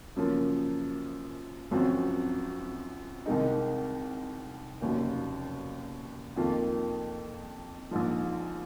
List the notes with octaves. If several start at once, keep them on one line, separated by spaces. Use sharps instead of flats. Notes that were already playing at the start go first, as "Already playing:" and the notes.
F#2 C#3 F3 A#3
G#1 F#2 F3 C4 F#4
C2 C3 D#3 G#3 D#4
F1 D#2 C#3 F#3
F2 D#3 A#3 F4
A#1 G#2 F3